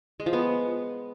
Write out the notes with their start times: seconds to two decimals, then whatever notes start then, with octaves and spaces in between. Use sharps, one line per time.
0.20 G#3
0.26 F3
0.33 B3